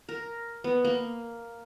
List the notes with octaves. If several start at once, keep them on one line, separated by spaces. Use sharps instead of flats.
A#4
B3
A#3